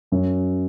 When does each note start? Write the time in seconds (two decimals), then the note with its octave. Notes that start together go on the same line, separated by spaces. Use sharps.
0.12 F#2 F#3 C#4